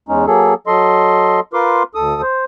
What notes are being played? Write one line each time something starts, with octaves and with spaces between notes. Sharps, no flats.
E2 G#3 C#4 D#4
F#3 A#3 G#4 A4
F#3 A4 D#5 C6
F4 A#4 B4 C6 D6
D2 A4 D#6
C5